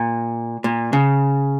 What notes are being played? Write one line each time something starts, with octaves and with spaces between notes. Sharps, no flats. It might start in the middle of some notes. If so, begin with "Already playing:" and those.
Already playing: A#2
A#2
C#3